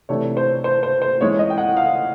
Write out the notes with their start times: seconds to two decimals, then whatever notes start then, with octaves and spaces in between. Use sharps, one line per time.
0.09 C3 E3 A3 D4 C#5
0.37 C5
0.64 C5
0.83 C5
1.02 C5
1.21 E3 G#3 C#4 C#5
1.39 D#5
1.50 G5
1.58 F#5
1.77 F5